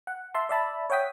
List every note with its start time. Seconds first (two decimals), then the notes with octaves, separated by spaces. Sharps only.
0.07 F#5
0.34 E5 A5 C6
0.49 D5 E5 A5 B5
0.90 C#5 E5 F#5 G5 D#6 B6